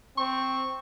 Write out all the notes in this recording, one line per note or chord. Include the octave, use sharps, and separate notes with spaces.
C4 C#6